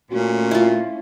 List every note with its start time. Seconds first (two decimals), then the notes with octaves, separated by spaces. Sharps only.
0.11 A#2 A3 C#4 F#4
0.51 E4 F4